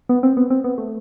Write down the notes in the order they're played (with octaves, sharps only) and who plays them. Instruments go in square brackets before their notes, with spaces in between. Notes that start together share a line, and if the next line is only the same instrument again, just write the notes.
[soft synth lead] B3
C4
B3
C4
B3
A3